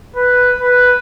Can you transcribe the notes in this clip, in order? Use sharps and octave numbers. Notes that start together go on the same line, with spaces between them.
B4
B4